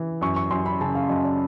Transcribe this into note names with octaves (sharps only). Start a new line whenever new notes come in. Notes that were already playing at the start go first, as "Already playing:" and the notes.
Already playing: E3
F#2 C#6
C#6
F#2 C6
B5
C#3 A5
F5
F#2 D#5
D5